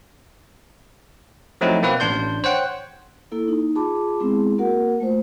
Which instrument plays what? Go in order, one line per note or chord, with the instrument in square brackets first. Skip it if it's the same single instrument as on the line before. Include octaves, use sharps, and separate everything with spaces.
[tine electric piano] F3 F#3 A3 C4 D#4 E4
B2 A#3 C4 B4
A1 D4 C6 G6
C5 C#5 F#5 G5
[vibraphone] A#3 E4 A4
D#4
F4 G#4 A5 B5 D6
G#3 B3 C4 E4 G#4
A#3 F#4 A#4 F#5
A3 F4 C5